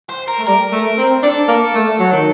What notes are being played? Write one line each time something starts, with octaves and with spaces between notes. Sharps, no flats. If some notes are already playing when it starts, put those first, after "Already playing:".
C5
A#4
A3
G3 A#4
A3
C4
D4 A4
A#3
A3
F#3
D#3